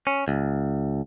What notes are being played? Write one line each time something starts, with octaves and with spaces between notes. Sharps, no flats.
C#4
C#2